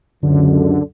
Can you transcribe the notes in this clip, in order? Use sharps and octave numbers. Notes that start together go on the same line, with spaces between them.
C#2 F#2 D3